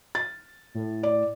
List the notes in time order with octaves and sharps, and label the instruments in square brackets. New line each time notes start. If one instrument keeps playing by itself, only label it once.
[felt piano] A6
[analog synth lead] A2
[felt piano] D5